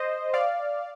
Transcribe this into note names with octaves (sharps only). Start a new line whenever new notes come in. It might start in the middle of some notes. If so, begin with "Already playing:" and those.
Already playing: C5 D#5
D5 F5